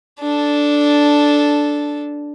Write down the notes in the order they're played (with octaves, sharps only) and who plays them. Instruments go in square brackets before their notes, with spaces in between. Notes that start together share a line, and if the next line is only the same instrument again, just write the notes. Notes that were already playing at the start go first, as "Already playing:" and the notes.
[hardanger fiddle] D4 A4